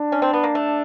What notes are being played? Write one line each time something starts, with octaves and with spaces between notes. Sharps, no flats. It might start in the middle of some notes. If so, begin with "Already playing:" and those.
Already playing: D4
C#4
C4
B3
A#3
A3